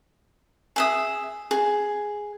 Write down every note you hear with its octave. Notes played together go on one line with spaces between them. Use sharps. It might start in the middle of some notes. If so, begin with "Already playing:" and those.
G#4 E5 D#6
G#4